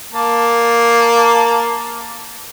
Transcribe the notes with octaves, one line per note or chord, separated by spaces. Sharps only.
A#3 A5